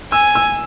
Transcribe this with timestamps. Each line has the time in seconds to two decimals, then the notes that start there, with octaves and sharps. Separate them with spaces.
0.12 G#5 E6
0.35 E6